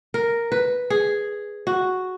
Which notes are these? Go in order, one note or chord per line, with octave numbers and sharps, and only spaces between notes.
A#4
B4
G#4
F#4